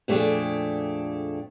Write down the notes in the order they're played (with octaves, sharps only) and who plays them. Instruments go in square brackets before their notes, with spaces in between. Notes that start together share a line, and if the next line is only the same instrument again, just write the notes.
[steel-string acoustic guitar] F2 A#2 A3 D4 G#4 G5